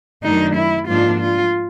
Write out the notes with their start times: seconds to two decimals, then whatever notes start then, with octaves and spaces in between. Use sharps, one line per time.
0.23 F#2 D#3 F#3 A3 D4 D#4
0.56 E4
0.88 G#2 F3 A#3 D4 F4
1.20 F4